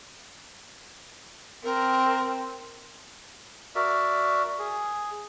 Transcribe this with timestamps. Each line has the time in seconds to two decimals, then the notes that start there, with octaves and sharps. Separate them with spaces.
1.64 C4 A#4
3.75 F#4 A#4 D5 E5
4.59 G#4